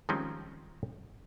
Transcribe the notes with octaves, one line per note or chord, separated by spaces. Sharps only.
D#3 F3 G3 G#3 C4 C#4